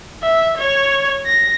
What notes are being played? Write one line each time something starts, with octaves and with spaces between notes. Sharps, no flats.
E5
C#5
A#6